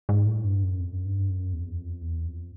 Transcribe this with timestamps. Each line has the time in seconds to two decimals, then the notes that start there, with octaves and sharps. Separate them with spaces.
0.09 G#2
0.27 A2
0.44 G2
0.63 F#2
0.81 F2
0.93 F#2
1.05 G2
1.29 F#2
1.53 E2
1.60 F2
1.67 E2
1.78 F2
2.02 E2
2.26 F2